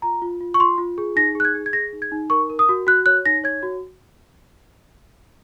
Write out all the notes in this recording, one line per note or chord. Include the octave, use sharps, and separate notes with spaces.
F4 A#5
F4
F4
C#6
F4 C6
F4
G#4
D#4 A#6
G#4 F#6
G#6
G#4
G#6
G#4 A#6
D#4
G#6
D#4
A#4 C#6
A#4
D#6
F#4
F#4 F#6
C#5 F#6
D#4 A#6
C#5 G#6
F#4